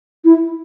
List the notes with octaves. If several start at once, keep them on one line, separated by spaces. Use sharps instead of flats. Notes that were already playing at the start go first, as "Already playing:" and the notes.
E4